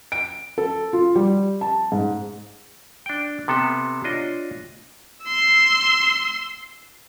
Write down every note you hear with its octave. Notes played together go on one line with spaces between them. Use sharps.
D7
A4
F4
G3
A5
G#2
D4 G5
C3 B3 A4
D4 F4 C#5 D#5
C6 E6